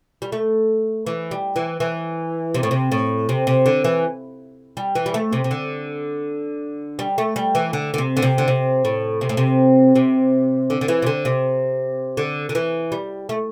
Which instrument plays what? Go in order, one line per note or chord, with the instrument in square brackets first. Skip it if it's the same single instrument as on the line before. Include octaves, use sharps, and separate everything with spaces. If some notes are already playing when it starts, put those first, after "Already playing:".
[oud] G3
A3
E3
G3
E3
E3
C3
A2
C3
A2
C3
C3
D3
E3
G3
E3
G3
A3
C3
C3
D3
G3
A3
G3
E3
D3
D3
C3
D3
C3
D3
C3
A2
C3
A2
C3
C3
D3
D3
E3
C3
D3
C3
D3
D3
E3
G3
A3